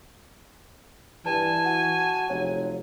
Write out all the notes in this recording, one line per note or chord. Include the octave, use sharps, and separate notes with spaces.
G2 E3 G#5 A5
F#4
F1 F#3